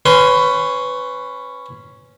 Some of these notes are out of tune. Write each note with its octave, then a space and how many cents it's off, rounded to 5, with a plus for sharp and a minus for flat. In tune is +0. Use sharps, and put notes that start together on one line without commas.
C#4 +0 B4 +20 C6 +0